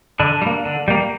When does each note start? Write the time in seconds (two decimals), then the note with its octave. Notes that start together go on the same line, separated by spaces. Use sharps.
0.20 D3 D4
0.42 G3
0.46 A#3
0.65 D3
0.88 G3 A#3